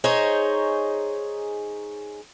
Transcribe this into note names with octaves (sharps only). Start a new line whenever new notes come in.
D#4 G#4 C5 C#5